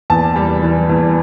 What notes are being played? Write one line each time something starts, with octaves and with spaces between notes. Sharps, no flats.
E2 A5
G3
E3
E2